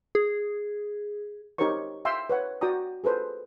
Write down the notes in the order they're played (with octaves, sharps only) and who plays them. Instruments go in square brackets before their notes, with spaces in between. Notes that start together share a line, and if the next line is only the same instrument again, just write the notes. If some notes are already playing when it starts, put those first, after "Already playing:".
[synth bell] G#4
[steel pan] D#4 G4 A#4 C5 C#5 C#6
E5 F5 G5 C6 E6
B4 C#5 F#5
F#4 D5 G5 A#5 D#6
G#4 A4 B4 C5